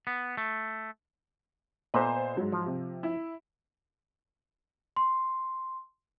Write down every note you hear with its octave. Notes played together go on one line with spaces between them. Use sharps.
B3
A3
A#2 B3 A4 B4 C5 D#5
G#2 F#3
F3
C3
E4
C6